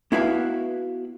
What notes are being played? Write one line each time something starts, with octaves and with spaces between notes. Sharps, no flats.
B3 E4 F#4 B4 E5 F5